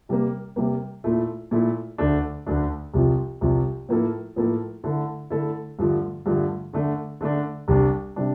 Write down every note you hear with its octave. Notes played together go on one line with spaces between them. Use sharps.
C3 G3 A#3
C3 G3 A#3
A#2 A3 E4
A#2 A3 E4
D2 D3 A3 D4
D2 D3 A3 D4
C2 C3 F3
C2 C3 F3
A2 F3 A#3 E4 A4
A2 F3 A#3 E4 A4
D3 A3 E4 A4
D3 A3 E4 A4
G2 D3 F3 A3
G2 D3 F3 A3
D3 A3 D4
D3 A3 D4
C2 C3 G3 D4
C3 G3 D4